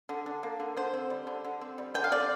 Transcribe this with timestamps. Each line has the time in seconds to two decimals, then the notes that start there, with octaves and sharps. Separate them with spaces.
0.09 D3
0.26 D4
0.43 A#3
0.60 D3
0.77 D3 C5
0.94 C4
1.10 G3
1.27 D3
1.44 D3
1.61 C4
1.78 G3
1.94 D3 G5
2.04 F5
2.11 C3 D5